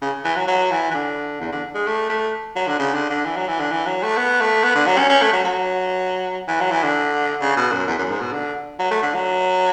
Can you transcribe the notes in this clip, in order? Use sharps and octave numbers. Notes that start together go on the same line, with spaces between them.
C#3
E3
F#3
F#3
E3
E3
D3
E2
D3
G#3
A3
A3
F#3
D3
C#3
D3
D3
E3
F#3
E3
D3
E3
F#3
A3
B3
A3
B3
D3
F#3
C#4
C#4
A3
F#3
F#3
E3
F#3
E3
D3
C#3
B2
F#2
E2
F#2
G#2
B2
D3
F#3
A3
D3
F#3